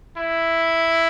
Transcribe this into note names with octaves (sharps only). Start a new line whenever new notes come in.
E4